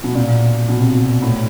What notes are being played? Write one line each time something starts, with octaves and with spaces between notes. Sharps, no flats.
B2
A#2
B2
C3
B2
A2